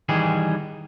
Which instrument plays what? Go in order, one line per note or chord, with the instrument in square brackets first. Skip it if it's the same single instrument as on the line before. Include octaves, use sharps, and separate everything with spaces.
[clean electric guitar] D#3 E3 G3 G#4